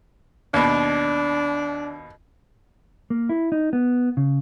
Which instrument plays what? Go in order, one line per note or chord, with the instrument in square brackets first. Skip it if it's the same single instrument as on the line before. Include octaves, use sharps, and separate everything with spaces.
[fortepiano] D#2 B2 [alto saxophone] D4
[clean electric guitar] A#3
E4
D#4
B3
C#3